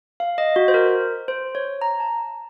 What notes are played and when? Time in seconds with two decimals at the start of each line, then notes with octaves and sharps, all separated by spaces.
0.20 F5
0.38 D#5
0.56 F#4
0.68 C5
0.74 A#4
1.28 C5
1.55 C#5
1.82 A#5
2.00 A5